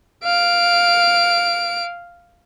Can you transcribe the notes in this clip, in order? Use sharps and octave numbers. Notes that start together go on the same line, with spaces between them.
F5 D7